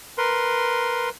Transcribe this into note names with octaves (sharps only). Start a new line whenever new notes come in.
A#4 B4 C6